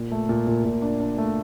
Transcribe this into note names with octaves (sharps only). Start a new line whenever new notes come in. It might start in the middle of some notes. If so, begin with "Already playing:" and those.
Already playing: A#2
A3
A#2
A#2
A#2
D4
D4
A3